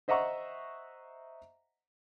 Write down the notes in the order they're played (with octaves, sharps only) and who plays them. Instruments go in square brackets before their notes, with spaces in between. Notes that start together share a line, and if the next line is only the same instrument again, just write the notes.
[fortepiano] C5 D#5 E5 F#5 A#5 C#6